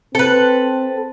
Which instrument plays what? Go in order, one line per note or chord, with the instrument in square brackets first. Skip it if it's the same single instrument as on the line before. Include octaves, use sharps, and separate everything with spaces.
[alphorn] C4 [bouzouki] A4 B4